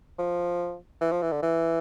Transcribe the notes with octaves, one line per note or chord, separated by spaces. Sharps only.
F3
E3
F3
E3
D3
E3